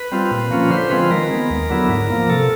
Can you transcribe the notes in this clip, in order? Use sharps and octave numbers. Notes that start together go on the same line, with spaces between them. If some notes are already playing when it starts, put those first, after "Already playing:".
Already playing: B4
G3 C4 F4
A#2
F3 A#3 C#4 F4
D3 C5
F3 G#3 C4 F4 B4
D#3 A#4
G#3 B3
D#2
D3 F#3 B3 E4
G#2
F3 A#3
C3 A4